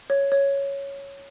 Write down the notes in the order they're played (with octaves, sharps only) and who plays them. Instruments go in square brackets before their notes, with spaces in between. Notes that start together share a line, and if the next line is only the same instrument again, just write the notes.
[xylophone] C#5
C#5